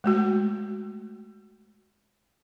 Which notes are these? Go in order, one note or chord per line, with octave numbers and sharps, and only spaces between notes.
G#3 A3 F#4